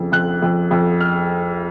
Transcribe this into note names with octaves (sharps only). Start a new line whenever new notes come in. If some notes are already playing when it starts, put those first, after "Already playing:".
Already playing: F2 C#3
F2 F#6
F2
F2
F6